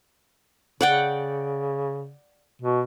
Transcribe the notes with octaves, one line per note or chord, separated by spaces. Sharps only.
C#3 D5 F#5 G5
B2